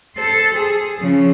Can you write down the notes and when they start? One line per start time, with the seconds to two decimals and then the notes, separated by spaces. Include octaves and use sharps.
0.16 A4 C5
0.54 G#4
0.98 C#3 F3